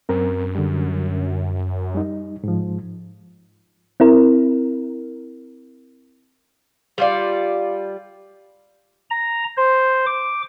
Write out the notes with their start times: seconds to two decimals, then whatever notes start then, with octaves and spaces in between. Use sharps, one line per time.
0.09 F#2 C4 A#4
0.55 D3 G3
1.95 G3 D#4
2.44 G#2 F3
4.00 C4 E4 A#4
6.98 G3 F4 D5
9.10 A#5
9.57 C5
10.06 D6